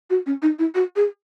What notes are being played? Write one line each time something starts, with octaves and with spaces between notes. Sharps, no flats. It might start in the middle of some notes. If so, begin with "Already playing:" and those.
F#4
C#4
D#4
E4
F#4
G#4